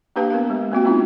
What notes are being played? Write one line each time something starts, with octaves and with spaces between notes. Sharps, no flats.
A#3 D4 G4 B4 F5 A5
B3 A#4 F5
G#3
A#3 C4 F#4 G5
G#3 B3 D4 D#4 F4